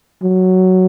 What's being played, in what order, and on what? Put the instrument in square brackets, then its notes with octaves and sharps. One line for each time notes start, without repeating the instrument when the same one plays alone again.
[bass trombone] F#3